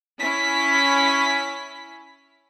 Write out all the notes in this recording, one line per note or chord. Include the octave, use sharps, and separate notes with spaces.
C#4 E4 B6